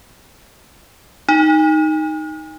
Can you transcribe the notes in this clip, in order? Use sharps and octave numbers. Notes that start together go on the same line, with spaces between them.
D#4